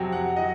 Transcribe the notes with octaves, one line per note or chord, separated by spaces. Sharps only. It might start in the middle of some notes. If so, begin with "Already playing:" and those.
Already playing: F2 C3 F#3 C4
F#5
F#3 D#5